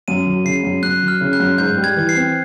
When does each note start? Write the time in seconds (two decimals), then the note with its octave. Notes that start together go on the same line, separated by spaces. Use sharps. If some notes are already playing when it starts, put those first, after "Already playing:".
0.08 F#2 D#7
0.26 F#3
0.45 C#3 C7
0.63 F#2
0.82 F#2 F#6
1.02 F#3
1.08 F6
1.21 C#3
1.33 F#6
1.40 F#2
1.58 G#2 G6
1.77 G3
1.84 G#6
1.96 E3
2.09 C7
2.16 C4